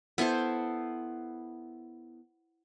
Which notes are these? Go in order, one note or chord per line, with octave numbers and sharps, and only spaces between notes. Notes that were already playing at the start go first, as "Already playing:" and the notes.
B3 E4 A4 C5